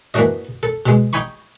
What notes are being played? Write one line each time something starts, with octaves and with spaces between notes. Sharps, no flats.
E3 A#3 D4 F#4 D#5
A4
B2 G#3
D#4 G5 G#5 B5 C#6